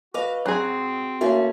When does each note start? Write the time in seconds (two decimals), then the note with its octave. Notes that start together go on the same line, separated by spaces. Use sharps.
0.14 F#4 B4 D#5 F5 D6
0.46 G#2 F#3 C4 G#4
1.21 G2 A3 A#3 C#4 E4 F#4 E5